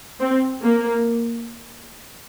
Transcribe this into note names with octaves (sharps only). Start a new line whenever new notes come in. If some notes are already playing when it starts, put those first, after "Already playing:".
C4
A#3